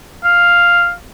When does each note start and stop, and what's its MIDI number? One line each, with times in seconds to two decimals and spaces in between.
0.24 0.92 77